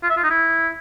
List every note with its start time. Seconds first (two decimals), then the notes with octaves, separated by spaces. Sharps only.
0.03 F4
0.10 E5
0.16 F4
0.23 D#4
0.30 E4